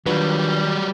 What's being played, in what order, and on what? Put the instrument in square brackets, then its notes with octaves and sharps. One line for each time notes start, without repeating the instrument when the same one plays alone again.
[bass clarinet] D#3 [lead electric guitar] F#3 G3 [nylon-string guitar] D4 F4 B4